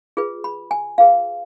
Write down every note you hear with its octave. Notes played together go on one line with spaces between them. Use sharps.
F4 G#4 B4
B5
G#5
F4 G#4 B4 F5